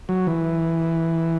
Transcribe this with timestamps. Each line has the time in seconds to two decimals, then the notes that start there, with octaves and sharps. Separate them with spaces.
0.09 F#3
0.27 E3